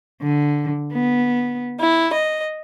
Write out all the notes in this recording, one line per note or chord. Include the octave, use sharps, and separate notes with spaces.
D3
B3
E4
D#5